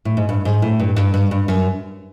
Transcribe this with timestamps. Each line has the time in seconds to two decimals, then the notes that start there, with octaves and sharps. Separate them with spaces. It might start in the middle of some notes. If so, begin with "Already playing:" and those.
0.05 A2
0.17 G#2
0.29 G2
0.45 G#2
0.62 A2
0.80 G2
0.96 G2
1.14 G2
1.31 G2
1.48 F#2